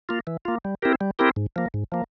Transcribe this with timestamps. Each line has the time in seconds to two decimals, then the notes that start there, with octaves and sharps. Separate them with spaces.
0.09 A#3 F4
0.27 E3
0.45 A#3 F4
0.65 G3
0.82 C4 E4 G4 A#4
1.01 G3
1.19 C4 E4 G4 A#4
1.36 G#2
1.56 F3 A#3
1.74 G#2
1.92 F3 A#3